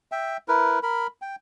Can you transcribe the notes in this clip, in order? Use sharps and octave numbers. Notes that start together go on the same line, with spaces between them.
E5 G5
E4 A#4 B4
A#4 B5
G5